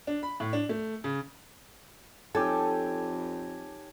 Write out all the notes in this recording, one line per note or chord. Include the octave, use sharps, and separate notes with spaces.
D4
B5
A2
D4
A3
C#3
F2 D#4 G4 A4 C#5 G#5 A5